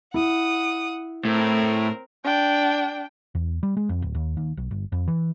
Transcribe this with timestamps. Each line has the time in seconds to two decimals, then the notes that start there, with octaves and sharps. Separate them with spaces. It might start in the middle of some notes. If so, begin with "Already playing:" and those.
0.14 E4 F#5 D#6
1.25 A2 C4 A#4
2.24 D4 G5
3.35 E2
3.63 G3
3.77 G#3
3.89 F2
4.02 D1
4.15 D#2
4.37 D#2
4.57 B1
4.71 G1
4.92 F2
5.08 E3